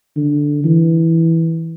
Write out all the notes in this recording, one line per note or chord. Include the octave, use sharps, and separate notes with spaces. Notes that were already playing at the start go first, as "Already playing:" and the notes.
D3
E3